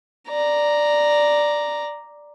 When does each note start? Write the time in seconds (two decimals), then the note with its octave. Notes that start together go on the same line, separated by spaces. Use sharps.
0.29 D5 A#5